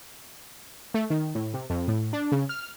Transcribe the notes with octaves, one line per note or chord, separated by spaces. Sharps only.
A3
D#3
A2
C3
F2
A2
D4
C#3
F6